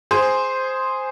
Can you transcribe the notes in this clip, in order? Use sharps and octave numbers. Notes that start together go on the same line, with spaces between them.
G#4 C5